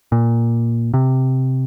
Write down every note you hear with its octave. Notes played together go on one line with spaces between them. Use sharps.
A#2
C3